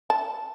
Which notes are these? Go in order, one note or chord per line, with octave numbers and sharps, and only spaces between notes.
A5